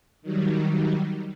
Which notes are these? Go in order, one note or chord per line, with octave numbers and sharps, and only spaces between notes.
D#3 F#3 G3